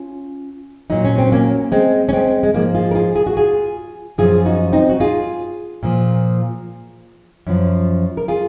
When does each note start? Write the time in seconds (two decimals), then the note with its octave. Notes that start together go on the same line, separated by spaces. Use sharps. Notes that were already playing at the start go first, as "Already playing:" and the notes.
Already playing: C#4 F4
0.90 A#2 F#3 D#4
1.05 C#4
1.18 C4
1.32 A#3 C#4
1.72 G#3 C4
2.09 C#4
2.13 G#3 C4
2.43 G#3
2.54 G#2 F3 A#3
2.75 F4 G#4
2.91 A#4
2.95 F4 G#4
3.16 G#4
3.27 F#4
3.37 F4 G#4
4.18 F#2 F3 F4 G#4
4.45 D#4 F#4
4.72 C4 D#4
4.89 F#4
5.00 F4 G#4
5.83 A#2 F3
7.47 F#2 F3
8.17 A#4
8.28 F4 G#4